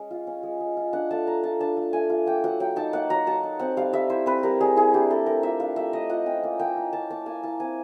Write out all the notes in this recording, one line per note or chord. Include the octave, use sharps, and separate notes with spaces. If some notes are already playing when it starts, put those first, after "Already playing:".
Already playing: G#3 C#4
F4
C#4
G#3
G#3
F4
D4 F#5
A3 A5
A3 A#5
F4 A5
D4 A5
A3
A3 G#5
F4
A#3 G5
F#3 F#5
F#3 G5
D#4 A5
A#3 F#5
F#3 A#5
F#3 A5
D#4
C4 F#5
G3 F5
G3 E5
E4 C5
C4 B4
G3 A#4
G3 G#4
E4 G#4
D4 G4
A3 A4
A3 A#4
F4 E5
D4 F5
A3 E5
A3 D#5
F4 F#5
C#4 G5
A#3
A#3 G5
E4
C#4 A5
A#3 A5
A#3 G#5
E4 A5
C4 G#5